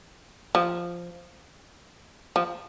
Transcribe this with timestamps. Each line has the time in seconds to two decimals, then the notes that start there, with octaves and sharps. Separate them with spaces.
0.55 F3
2.36 F3